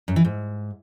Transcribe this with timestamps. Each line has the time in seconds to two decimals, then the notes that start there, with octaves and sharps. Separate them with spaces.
0.08 F#2
0.16 E3
0.25 G#2